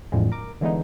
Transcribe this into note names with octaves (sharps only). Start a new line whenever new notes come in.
A1 F2 A2 D3 F3 G#3
A#4 D6
D3 E3 G#3 B3 D#4